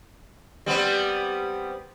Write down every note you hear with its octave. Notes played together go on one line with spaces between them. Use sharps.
G3 B3 C4